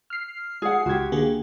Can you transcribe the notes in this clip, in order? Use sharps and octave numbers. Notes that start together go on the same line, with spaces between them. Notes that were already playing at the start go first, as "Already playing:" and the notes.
F6 C7
G#4 F#5
C#2 F#4 G4 G#6
D3 A#3 G#4